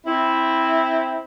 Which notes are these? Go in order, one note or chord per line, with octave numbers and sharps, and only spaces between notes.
C4 E4